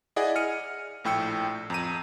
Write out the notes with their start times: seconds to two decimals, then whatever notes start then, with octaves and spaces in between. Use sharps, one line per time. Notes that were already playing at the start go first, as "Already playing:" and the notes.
0.16 E4 G#4 D5 D#5 F#5 G#5
0.36 F6 C#7 D#7
1.04 A#1 A2 G5 E6 C#7
1.70 F2 A#5 D#7